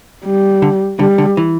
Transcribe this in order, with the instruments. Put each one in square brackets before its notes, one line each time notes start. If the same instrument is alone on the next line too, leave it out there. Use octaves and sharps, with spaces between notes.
[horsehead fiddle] G3
[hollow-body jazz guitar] D3
[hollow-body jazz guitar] D3 [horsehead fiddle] G3
[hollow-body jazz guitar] D3
E3